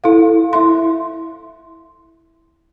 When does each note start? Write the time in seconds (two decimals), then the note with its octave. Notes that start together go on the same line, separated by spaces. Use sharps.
0.04 E4 A4 F5
0.53 E4 E5 C6